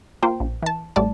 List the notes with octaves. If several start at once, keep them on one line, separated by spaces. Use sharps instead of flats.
A#3 F4 C5 G5
A#1
E3 A5
A1 A2 G3 D5 A5